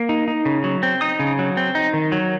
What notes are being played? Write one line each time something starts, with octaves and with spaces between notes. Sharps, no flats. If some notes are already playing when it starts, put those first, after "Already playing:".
Already playing: A#3
D#4
D#4
C#3
F#3
C4
D#4 D#6
C#3
F#3
C4
D#4
D#3
F#3